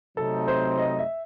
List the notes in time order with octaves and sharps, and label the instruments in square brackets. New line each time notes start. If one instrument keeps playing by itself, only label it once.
[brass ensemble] C3 F#3 A3 C4 D#4 [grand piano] A4
[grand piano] C5
D#5
E5